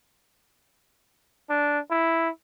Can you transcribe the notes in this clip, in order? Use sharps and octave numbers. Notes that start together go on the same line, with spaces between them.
D4
E4